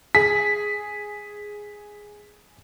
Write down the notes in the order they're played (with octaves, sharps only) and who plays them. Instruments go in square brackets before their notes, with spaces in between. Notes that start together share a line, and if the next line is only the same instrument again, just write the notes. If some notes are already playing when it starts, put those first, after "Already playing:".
[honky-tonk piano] G#4 [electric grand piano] B6